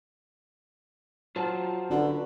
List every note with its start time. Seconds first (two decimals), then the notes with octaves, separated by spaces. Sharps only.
1.36 F#3 F4 C5 A5
1.90 D3 C#4 F#4 B4